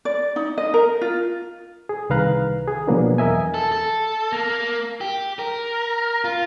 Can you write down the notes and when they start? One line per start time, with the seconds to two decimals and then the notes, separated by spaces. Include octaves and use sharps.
0.05 D5
0.36 D#4
0.58 D#5
0.74 A#4
1.01 F4
1.89 G#4
2.10 C2 D#3 B4 F5 A#5 F#6
2.68 G#4
2.87 B2 F3 F#3 A#3 B3 D4
3.18 E2 A#4 D#5 E5 G#5
3.54 A4
3.72 A4
4.32 A#3
5.01 G4
5.39 A#4
6.25 F4